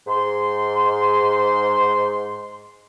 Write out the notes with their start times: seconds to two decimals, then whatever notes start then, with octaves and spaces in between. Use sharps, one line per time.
0.07 G#2 C6